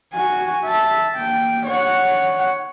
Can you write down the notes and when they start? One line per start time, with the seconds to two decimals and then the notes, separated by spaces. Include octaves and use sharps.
0.14 F#4 G#5
0.65 E5 A5
1.16 A#3 G5
1.66 C#5 F#5